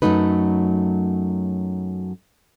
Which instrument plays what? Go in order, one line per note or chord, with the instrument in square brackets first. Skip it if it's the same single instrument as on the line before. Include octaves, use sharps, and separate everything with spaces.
[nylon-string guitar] F#2 A#2 F#3 A3 D#4 B4